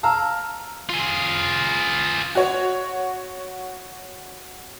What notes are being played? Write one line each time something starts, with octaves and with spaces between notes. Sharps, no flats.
F5 A5 A#5 E6 F6
F4 G#4
F#4 C#5